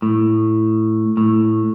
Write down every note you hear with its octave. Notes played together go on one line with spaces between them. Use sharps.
A2
A2